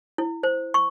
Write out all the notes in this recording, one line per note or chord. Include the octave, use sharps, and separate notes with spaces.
E4
C5
C#6